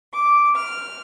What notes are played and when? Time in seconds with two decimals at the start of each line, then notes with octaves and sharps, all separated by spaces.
0.12 D6
0.54 F6